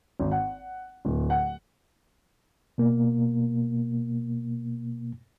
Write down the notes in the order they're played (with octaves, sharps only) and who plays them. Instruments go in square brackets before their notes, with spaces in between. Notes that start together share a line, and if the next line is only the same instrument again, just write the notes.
[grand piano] G#1
F#5
D1
F#5
[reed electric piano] B2 A#3